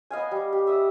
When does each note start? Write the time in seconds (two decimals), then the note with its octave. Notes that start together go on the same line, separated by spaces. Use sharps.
0.11 B3 D#5 F5 G#5
0.31 G3
0.53 G4
0.67 E5 D#6